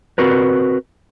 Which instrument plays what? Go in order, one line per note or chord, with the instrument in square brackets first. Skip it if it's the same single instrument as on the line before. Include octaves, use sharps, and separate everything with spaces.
[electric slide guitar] C4 F#4 A#4 B4